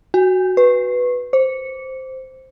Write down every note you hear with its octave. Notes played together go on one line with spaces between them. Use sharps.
F#4
B4
C5